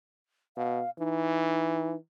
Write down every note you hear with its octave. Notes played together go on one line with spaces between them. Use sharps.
B2 F5
E3 D#4